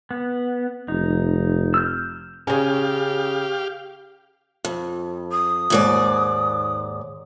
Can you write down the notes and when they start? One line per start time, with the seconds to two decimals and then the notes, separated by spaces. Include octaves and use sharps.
0.11 B3
0.88 F1 D#4
1.74 E6 F6 G6
2.47 C#3 C#4 G4 F5
4.65 F2
5.32 D#6
5.70 D#2 G#2 D5